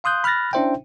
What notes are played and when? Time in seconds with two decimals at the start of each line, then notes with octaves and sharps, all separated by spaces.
0.04 F5 C6 D#6 F#6 G6
0.24 B5 F6 F#6 A6 A#6
0.53 C#4 D4 E4 C5 E5 G5